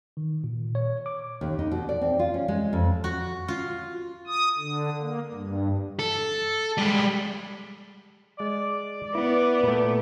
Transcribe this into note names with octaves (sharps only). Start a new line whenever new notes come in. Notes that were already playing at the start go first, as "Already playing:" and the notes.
D#3
A#2
C#5
D6
D#2
D#4
B2
D5
C4
F4
C#4
G#3
F2
F#4
F4
D#6
D3
A#3
G2
A4
G3 G#3
G#3 D5
B3 E4
A#2 A3